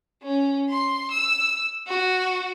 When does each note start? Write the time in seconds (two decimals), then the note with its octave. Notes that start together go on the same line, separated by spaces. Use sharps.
0.23 C#4
0.69 C6
1.11 E6
1.87 F#4